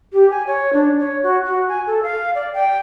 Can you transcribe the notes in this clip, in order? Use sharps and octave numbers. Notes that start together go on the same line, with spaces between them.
G4
G#5
C#5
D4
C#5
F#4
F#4
G#5
A4
F5
D5
G5